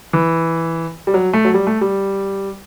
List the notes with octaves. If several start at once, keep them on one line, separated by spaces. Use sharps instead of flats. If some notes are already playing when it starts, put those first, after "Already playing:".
E3
G3
F#3
A3
F#3
G3
A3
G3